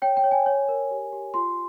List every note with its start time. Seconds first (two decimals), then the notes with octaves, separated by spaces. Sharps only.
0.02 C#5 G5
0.17 G5
0.24 C#5
0.31 G#5
0.46 C#5
0.69 A#4
0.91 G4
1.13 G4
1.34 F4 C6